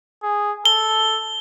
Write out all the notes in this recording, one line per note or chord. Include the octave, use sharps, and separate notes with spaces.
G#4
A4 G7